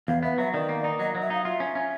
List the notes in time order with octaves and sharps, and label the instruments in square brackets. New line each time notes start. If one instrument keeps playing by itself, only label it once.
[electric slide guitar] E2 [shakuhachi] F5
[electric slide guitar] B3 [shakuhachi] E5
[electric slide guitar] F#3 [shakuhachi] E5
[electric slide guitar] D#3 [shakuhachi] D5
[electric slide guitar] A#3
D#4
[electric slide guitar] F#3 [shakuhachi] D#5
[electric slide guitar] F#3
[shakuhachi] E5
[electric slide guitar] D#4 [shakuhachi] F5
[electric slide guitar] F4 [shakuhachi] E5
[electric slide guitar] C#4
C#4